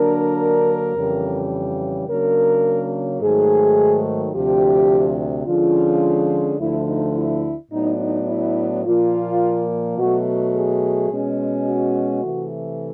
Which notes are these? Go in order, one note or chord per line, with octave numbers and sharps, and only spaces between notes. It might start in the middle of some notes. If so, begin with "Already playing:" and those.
Already playing: D3 F#3 A#3 D4 A#4
F2 C#3 E3 G3
C#3 F#3 A#3 D4 A#4
G#2 D#3 F#3 A3 G#4
D2 C3 F3 G4
D3 F3 G#3 C#4 F4
D2 D3 F3 A3 E4
D#4
E4
A2 F#3 B3 D4 D#4
D#4
E4
A#2 F3 A#3 F4
B2 F#3 A3 F#4
G#4
B2 G#3 C#4
F#4
C3 E3 A3